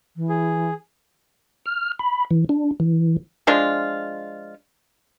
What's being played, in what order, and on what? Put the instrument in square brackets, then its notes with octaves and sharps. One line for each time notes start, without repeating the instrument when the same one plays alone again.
[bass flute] E3
[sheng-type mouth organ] G#4
[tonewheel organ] F6
B5
E3
D4
E3
[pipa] F3 G#3 D4 F4